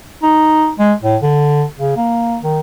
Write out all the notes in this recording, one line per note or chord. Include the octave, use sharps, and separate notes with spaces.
D#4
G#3
A2
D3
C#3
A#3
D#3